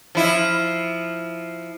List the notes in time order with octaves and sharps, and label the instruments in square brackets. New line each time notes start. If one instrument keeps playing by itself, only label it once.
[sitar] F3 E4